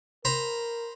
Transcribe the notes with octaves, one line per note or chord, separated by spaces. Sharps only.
A#4 C5 A#5 B5